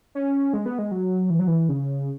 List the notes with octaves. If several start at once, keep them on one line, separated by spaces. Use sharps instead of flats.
C#4
G#3
B3
G#3
F#3
E3
F#3
E3
C#3